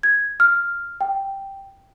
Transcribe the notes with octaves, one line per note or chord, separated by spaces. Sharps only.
G#6
F6
G5